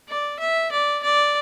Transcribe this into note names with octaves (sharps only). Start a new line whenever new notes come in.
D5
E5
D5
D5